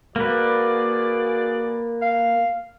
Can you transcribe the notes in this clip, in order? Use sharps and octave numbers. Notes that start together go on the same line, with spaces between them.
A#3 F#4 G#4 B4 D5
F5